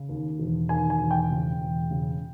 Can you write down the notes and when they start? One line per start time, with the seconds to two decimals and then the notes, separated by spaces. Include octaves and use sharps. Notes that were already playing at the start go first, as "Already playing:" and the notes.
Already playing: C#3
0.09 D#2
0.39 E1
0.69 D#2 G#5
0.90 G#5
1.00 E1
1.11 G5
1.31 C#3
1.61 E1
1.91 C#3